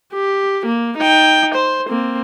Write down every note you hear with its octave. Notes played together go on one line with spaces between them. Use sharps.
G4
A#3
D#4 G5
C5
A#3 C4